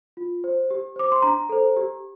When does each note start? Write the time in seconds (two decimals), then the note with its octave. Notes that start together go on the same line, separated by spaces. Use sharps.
0.17 F4
0.44 C5
0.71 G4
0.96 C5 D6
1.12 C6
1.22 D4 A#5
1.49 A4 C5
1.77 G4